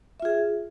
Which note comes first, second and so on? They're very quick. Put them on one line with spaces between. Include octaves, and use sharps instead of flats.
E5 F4 G#4